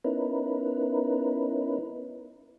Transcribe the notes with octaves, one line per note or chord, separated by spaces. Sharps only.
B3 C#4 D#4 E4 A#4 B4